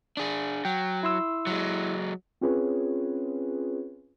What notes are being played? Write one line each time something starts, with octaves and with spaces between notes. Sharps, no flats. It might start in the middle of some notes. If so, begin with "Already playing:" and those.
D4 G#4
F#3 G5
E4 C6 E6
F#3 G#3
C4 C#4 F4 G#4 B4 C#5